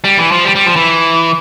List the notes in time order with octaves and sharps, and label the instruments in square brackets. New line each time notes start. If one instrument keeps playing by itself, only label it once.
[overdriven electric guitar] G3
E3
F3
G3
G3
F3
E3